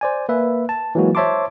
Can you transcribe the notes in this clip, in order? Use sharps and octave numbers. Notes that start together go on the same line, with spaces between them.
C5 D5 G#5
A#3 B4 E5
A5
E3 F#3 G#3 A#3 F#4
C5 C#5 E5 A5 C6 D6